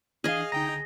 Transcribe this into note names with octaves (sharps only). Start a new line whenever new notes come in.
E3 D4 G#4 D#5 F5 F6
C2 D3 D#4 G5 A#5 A#6